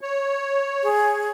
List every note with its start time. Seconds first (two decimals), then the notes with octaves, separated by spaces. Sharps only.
0.01 C#5
0.83 G#4